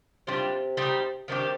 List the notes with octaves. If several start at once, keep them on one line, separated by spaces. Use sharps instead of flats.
C3 G3 D4 F4
G3 C4 D#4 G4
C3 D#3 G3 D4 G4